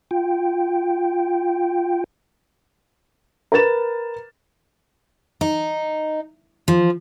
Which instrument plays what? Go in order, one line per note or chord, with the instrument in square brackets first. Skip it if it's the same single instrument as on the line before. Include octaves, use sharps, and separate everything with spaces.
[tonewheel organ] F4 G5
[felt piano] A#4 B4 A6 E7
[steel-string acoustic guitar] D#4
F3